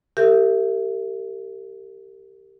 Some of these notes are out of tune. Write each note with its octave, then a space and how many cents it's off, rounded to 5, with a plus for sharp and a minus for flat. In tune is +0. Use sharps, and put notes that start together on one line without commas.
G4 +0 A#4 -40 E5 +20